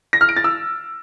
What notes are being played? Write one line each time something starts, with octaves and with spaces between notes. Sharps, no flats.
A#6
F6
D7
A6
E6